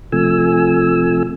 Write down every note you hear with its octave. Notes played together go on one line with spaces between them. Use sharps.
C3 F3 A3 G#5 E6